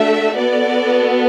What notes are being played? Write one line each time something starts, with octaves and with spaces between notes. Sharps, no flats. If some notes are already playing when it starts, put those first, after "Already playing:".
Already playing: A3 D4 F#4 E5
B3 F#4 A4 D5